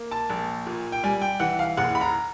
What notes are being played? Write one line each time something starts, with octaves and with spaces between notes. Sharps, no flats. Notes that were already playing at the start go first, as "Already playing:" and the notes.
Already playing: A#3
A5
A#1
A#2
G5
G3 G#5
G5
E3 F#5
F5
F#1 F#5
B5
A#5